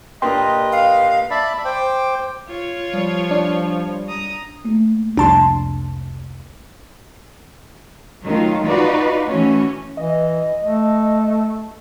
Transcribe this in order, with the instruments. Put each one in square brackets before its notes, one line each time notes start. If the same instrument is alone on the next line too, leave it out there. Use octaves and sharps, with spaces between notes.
[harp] A#2 D4 A#4 [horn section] G4 B4 D#5 [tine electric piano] G5 C6
[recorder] F5
[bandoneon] D5 E5 A5 B5
C5 G5 D6
[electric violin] F4 C#5
[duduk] F3 [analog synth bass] G3
[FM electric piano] D4
[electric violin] A#5 D#6
[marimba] A3 A#3
[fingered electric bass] C2 F2 [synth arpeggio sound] D4 A5 C6
[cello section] D#3 F#3 A3 F4
D#4 F4 F#4 B4 D5
E3 A3 C#4 F#4
[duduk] E3 [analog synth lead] D#5
[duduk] A3